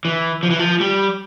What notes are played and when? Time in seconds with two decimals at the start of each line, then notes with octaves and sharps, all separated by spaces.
0.05 E3
0.43 F3
0.50 E3
0.59 F3
0.80 G3